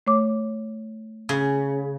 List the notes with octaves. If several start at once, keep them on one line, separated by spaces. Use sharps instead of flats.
A3 C#5 D6
C#3